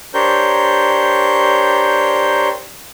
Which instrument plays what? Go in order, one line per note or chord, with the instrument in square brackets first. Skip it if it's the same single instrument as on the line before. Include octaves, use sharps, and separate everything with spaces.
[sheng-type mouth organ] D4 G4 A#4 C5 C#5 G6